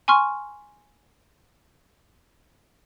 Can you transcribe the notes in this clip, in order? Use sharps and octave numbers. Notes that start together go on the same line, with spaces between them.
G#5 C6 C#6 F6